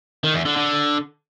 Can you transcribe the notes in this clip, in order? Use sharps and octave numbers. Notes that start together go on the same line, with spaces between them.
D#3
E2
D3
D3